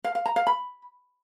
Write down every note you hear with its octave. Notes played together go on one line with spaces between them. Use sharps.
F5
F5
A#5
F5
B5